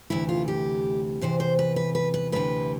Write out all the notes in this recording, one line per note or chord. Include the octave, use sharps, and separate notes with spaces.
D2 C3 E3 E4
F4
G4
E2 C3 E3 C5
C5
B4
B4
B4
B4
D2 C3 E3 B4